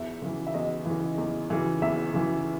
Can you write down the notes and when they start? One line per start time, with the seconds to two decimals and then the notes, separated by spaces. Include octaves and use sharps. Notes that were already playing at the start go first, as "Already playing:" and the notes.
Already playing: E2 E5
0.22 C#3 E3
0.47 E5
0.54 E2 D#5
0.86 C#3 E3
1.18 E2
1.50 C#3 E3
1.82 E2 E5
2.14 C#3 E3